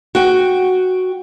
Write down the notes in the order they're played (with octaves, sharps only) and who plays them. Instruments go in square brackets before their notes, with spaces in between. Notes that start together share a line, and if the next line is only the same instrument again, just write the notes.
[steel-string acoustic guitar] F#4 G5